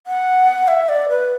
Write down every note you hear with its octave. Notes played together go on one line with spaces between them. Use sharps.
F#5
E5
D5
B4